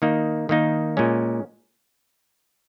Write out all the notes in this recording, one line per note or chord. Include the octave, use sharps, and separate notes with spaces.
D#3 A#3 D#4
D#3 A#3 D#4
A#2 G#3 C#4